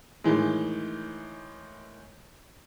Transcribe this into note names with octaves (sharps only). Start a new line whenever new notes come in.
A2 D#3 E3 G#3